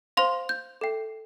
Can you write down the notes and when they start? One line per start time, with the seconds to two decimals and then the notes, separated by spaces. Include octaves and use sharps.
0.17 C5 F5 C6
0.49 G6
0.81 A4 E5 G5